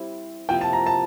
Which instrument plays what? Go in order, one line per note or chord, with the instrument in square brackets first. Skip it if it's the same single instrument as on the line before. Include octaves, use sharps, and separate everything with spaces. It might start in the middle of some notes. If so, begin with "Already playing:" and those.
Already playing: [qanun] G3 C4 E4
[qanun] C3 F3 A#3 E4 [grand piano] G5
[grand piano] A5
A#5
A5